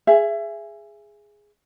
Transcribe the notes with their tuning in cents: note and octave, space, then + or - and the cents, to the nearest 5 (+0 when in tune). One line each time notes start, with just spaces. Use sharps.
G#4 +0 E5 +25